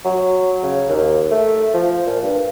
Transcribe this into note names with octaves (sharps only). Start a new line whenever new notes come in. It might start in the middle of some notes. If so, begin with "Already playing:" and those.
F#3
C#3
D#2
A3
F3
A#2
G2